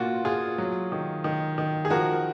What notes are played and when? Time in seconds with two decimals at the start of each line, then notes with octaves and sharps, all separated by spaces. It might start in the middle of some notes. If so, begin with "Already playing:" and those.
Already playing: A#2 A#3 F4 F#4
0.25 A#2 F4 G#4
0.58 F#3
0.92 D#3
1.24 D#3
1.58 D#3
1.85 G#4
1.90 F3 F#4 A#4